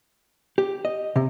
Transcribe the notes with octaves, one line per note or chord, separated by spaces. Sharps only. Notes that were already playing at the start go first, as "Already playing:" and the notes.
G4
D#5
C3